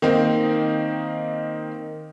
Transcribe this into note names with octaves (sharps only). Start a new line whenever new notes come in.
D#3 A#3 C4 D#4